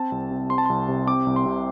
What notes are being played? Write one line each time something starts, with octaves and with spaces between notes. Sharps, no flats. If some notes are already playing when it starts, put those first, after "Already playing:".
Already playing: C4 A5
C2
C3
C4 C6
A5
C2 C6
C3
C4 D6
C2
C6
C3